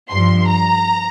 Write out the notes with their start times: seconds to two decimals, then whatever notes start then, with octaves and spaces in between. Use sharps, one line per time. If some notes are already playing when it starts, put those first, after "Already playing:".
0.11 G2 F3 C6
0.48 A#5